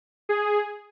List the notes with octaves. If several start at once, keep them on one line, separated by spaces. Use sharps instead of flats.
G#4